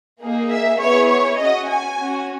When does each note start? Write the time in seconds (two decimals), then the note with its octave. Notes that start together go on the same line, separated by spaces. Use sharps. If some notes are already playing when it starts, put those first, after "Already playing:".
0.20 A#3 D#4 G#4
0.49 E5
0.80 B3 E4 G#4 C#5
1.08 C#5
1.37 C#4 F#4 D#5
1.67 G#5
1.97 C#4 F#4